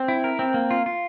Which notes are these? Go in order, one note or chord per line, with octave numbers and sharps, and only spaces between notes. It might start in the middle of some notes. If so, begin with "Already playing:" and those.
Already playing: C4
E4
A#4
C4
A#3
F4
F4